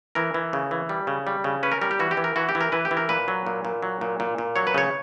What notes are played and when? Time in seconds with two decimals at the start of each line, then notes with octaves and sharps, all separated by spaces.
0.15 E3 A#4
0.34 E3
0.53 C#3
0.71 E3
0.89 G3
1.07 C#3
1.27 G3
1.44 C#3
1.63 C#4 B4
1.72 A#4
1.82 G3 A#4
1.91 G4
1.99 E3 F#4
2.11 G4
2.17 E3
2.24 A#4
2.36 E3 F#4
2.49 G4
2.55 E3
2.61 A#4
2.72 E3 B4
2.85 G4
2.91 E3
2.97 A#4
3.09 A#2 B4
3.28 F#3
3.46 A#2
3.65 A#2
3.83 F#3
4.01 A#2
4.20 A#2
4.38 A#2
4.56 F#3 C#5
4.67 B4
4.74 C#3 C#5